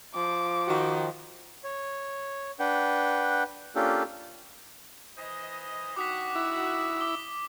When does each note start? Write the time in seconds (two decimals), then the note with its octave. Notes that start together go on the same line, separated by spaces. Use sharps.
0.15 F3 D6
0.68 D#3 F#4
1.64 C#5
2.59 D4 B4 F#5 G5
3.76 A#3 C#4 D4 F4 G4 A4
5.17 E3 C5 D#5
5.96 D#3 D4 F#4 D6 D#6 B6
6.35 E4
7.01 D6 G7